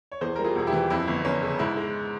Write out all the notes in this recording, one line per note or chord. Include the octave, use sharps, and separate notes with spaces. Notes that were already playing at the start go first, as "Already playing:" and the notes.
C#5
E2 G#4 C5
G3 A#4
F4 G#4
E1 G#4
E4 G4
E3
F2 E4
G1
G1 C#4
C#3
G#2 E4
G#3